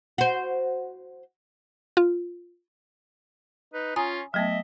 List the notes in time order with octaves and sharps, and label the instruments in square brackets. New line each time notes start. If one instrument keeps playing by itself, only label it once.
[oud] F#4 C5
[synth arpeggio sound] F4
[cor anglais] D#4 [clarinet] B4
[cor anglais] C#4 [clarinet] F4 [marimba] G#5 A#5 D#6
[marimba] F#3 A3 B3 [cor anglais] D#5 [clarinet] E5